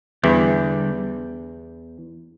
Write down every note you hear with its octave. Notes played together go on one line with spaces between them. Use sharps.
E2 D3 E3 G3 D4 G4